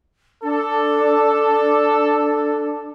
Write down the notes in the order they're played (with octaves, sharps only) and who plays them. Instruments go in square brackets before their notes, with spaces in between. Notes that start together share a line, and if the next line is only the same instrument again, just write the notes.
[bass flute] D4 [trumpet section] A4